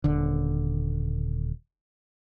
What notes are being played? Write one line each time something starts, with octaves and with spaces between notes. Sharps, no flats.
D#1 D3